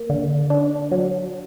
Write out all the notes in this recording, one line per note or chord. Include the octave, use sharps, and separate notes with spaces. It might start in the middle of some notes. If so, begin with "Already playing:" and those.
Already playing: A#3
D3
D4
F#3